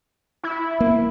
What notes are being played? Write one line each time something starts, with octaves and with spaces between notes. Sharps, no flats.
E4
A#3